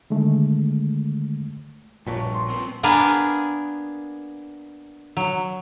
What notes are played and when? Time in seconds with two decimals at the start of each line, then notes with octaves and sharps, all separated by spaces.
0.10 D3 D#3 G#3 A3
2.06 A#1 G2 A#2 C#5 A5
2.34 C6
2.49 B3 C4
2.83 A#3 B3 D4 G#4 A#4
5.17 F#3